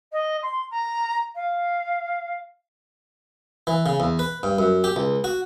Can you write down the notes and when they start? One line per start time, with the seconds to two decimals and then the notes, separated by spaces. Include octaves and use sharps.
0.12 D#5
0.42 C6
0.70 A#5
1.35 F5
3.67 E3
3.86 C#3
4.00 E2
4.19 B4
4.43 G2
4.59 F#2
4.84 G4
4.96 C#2
5.24 F#4